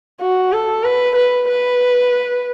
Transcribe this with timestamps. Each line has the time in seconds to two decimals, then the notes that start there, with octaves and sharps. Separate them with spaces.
0.21 F#4
0.52 A4
0.84 B4
1.16 B4
1.48 B4